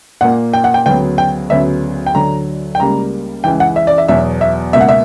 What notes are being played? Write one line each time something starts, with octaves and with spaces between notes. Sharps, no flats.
A#2 A#3 F#5
G5
F#5
G5
D2 C#3 F#3 B3 G5
G5
D2 C#3 F#3 B3 E5
G5
D2 D3 F#3 A#5
G5
C#2 C#3 G3 A#3 A#5
C#2 C#3 E3 G5
F#5
E5
D5
E5
E2 B2 F#3 E5
E5
C#2 B2 A#3 E5
F#5
E5